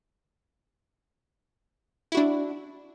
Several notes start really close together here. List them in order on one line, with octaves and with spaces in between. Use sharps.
E4 F#4 D4